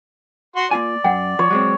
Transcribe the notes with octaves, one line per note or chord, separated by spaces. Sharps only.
F#4 C6
A#3 F4 D5 G#5
F#2 F#5 G5
F3 C#5
F#3 G#3 C4